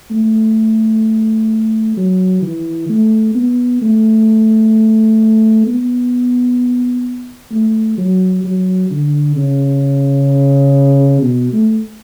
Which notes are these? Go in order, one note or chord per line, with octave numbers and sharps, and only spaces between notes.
A3
F#3
E3
A3
B3
A3
B3
A3
F#3
F#3
D3
C#3
B2
A3